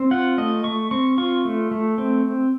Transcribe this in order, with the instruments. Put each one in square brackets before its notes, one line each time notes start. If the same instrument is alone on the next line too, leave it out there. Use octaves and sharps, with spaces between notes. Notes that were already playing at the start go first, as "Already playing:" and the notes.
Already playing: [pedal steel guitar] C4
F4 F#5
A3 D#5
A3 C#6
C4 C#6
F4 C#6
A3
A3
C4